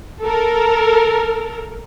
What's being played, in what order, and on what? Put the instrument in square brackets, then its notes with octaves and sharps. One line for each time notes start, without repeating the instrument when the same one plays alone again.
[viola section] A4 A#4